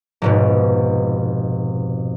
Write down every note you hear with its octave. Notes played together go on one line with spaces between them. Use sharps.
F1 G#2 B2